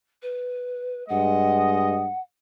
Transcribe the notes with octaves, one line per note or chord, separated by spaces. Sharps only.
B4
G2 G#3 D#5 F#5